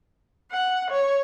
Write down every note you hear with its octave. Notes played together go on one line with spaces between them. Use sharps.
F#5
C#5